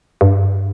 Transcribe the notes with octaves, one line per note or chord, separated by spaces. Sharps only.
G2